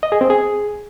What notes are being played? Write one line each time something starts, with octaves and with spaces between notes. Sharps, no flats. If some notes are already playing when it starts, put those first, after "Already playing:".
D#5
G#4
C4
G#4